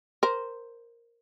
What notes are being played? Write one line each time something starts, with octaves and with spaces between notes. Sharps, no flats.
A#4 C5